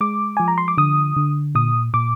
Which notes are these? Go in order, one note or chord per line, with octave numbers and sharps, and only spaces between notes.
G#3 D6
F3 G#5
A#5
C6
D6
D3 D#6
D3
A#2 D#6
A#2 D6